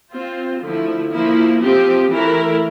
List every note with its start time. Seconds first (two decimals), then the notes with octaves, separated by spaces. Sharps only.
0.11 C4 F4 C5
0.61 D3 F3 A3 E4
1.11 F3 A#3 E4
1.60 F3 C4 G4
2.10 E3 A3 E4 A#4